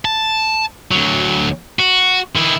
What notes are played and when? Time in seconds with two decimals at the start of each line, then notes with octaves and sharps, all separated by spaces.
0.05 A5
0.91 D2 F#3
1.79 F#4
2.36 D#3 E4